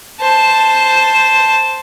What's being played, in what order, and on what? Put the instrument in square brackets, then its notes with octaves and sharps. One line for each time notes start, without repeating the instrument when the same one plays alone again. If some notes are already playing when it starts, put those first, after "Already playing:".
[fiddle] C5 A5